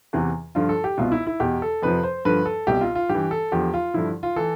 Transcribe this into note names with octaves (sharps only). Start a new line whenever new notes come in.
E2 C3 E3
G2 D3 F3 F4
A4
G4
C2 B2 F4
E4
E4
E2 B2 G4
A4
F2 C3 F3 B4
C5
G2 D3 F3 B4
A4
C2 B2 G4
F4
F4
G2 E3 G4
A4
E2 D3 F3 G4
F4
G2 D3 F3 E4
F4
E3 A4